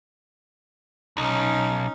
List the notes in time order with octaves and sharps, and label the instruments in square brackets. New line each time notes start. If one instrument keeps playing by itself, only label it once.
[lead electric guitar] B1 [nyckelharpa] C#4 D#4